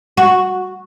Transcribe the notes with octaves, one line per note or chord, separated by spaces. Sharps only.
F#4